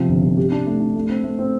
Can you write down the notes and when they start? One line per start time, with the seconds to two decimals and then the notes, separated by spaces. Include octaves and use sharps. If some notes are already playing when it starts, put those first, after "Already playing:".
Already playing: C3 F3
0.09 G1
0.23 C3
0.37 G4
0.52 D4
0.67 A3
0.80 D4
0.95 A3
1.10 C4
1.24 A3
1.39 C4